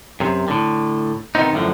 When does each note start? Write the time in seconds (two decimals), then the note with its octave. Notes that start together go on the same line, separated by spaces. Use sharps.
0.20 F#2 C3
0.48 A2 D3
1.35 C3 D#3 G#3 B3 C4 D#4
1.53 F#2 A2 D3 F3